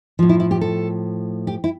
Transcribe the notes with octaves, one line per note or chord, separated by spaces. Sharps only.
A2 F3
E4
E4
G4
A4
G4
E4